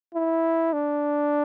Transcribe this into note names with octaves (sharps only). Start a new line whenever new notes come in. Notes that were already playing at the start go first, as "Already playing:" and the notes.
E4
D4